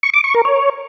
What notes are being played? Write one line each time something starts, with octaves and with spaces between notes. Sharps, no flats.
C#6
D6
C#6
A#4
C#5